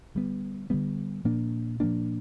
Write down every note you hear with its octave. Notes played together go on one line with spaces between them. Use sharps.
D3 G3 B3
D3 G3 B3
A#2 F3 A#3 D4
A#2 F3 A#3 D4